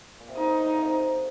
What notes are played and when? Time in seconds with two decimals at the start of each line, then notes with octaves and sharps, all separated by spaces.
0.20 A#2
0.28 C3
0.35 D3 D#4
0.65 A#2
0.76 C3